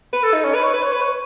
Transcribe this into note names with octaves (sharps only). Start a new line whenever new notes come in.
B4
A4
D#4
C#4
B4
C#5
B4
C#5
B4
C#5